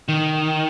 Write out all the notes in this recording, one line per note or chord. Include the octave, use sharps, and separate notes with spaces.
D#3